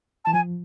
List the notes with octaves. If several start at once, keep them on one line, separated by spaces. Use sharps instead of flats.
E3 A5
F3 G#5